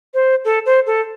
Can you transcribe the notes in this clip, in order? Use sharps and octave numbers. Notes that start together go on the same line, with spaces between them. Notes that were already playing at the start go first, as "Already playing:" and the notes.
C5
A4
C5
A4